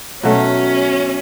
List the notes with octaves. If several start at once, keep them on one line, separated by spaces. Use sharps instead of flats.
B2 F#3 A3 C#4